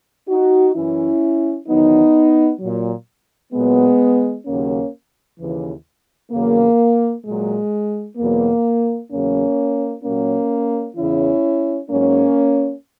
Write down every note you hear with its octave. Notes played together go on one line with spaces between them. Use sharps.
D#4 F#4
F#2 E3 C#4 E4
E2 D#3 F#3 B3 D#4
A#2 F#3
A#2 F#3 G#3 B3
D#2 C#3 F#3 A#3 C#4
D#2 C#3 E3
E2 C#3 F#3 A#3
A#2 F#3 G#3
E2 B2 F#3 A#3
E2 C#3 F#3 A#3 C#4
A#2 F#3 A#3 C#4
E2 C#3 E3 C#4 E4
G#2 F#3 A#3 C#4